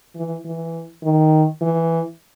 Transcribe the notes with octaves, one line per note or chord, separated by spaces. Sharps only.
E3
E3
D#3
E3